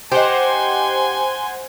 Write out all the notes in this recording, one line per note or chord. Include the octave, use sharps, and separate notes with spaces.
D#4 G4 C5 F#5 G#5 C6